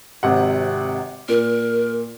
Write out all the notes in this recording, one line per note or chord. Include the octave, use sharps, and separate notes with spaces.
G#1 C3 F#5
A#2 A#4